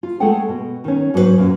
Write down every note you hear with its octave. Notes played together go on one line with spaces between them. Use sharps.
F4
G#3 A3 G#4 A4 F#5 G5
B2
D#3 C#4
G#2 F#3 G#3 D#4 B4 C5
F#2 A#2